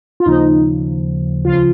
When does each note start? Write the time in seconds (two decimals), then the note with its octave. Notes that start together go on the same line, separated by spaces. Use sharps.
0.20 F4
0.26 D#2 C#3 F3 D#4
1.45 C#2 C#3 F3 F4